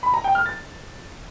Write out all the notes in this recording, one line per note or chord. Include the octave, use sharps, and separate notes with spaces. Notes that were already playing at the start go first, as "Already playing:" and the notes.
B5
A#5
G5
F6
A6